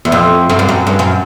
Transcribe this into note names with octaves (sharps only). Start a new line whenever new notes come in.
E2
F2
F#2
G2
F#2
G2
F#2